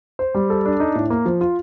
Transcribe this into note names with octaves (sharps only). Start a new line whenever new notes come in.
C5
G3
A4
D4
D#4
A2
A#3
F3
F4